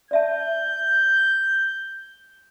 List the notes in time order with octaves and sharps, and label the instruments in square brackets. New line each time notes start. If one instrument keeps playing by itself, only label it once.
[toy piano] D5 E5 A5 [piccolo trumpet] G6